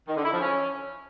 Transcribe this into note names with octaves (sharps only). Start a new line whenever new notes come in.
D#3
D3
E4
F3
C#4